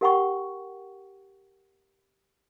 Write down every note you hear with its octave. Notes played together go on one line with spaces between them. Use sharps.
G4 A#4 F#5 G5 B5 C#6